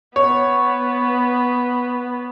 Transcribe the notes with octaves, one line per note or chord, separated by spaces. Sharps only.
B3 C#5